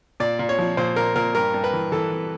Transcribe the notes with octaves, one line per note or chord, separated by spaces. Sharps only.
A#2 D5
A#2
C#5
F3
A#2 C5
A#2 A#4
A#2 A#4
G2 A#4
G2
B4
E3
E3 A4
E3